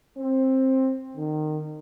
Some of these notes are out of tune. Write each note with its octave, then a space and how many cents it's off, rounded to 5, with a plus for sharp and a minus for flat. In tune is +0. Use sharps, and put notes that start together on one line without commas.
C4 +15
D#3 -25